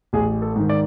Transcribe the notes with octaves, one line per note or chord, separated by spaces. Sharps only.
A1 G#4
A4
G#2 D#3
D5